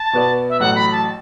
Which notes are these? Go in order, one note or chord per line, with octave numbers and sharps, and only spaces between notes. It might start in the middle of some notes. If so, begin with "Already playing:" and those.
Already playing: A5
B2 B3 F#4 B4 D5
E5
A1 A2 F#3 F#5
B5
A5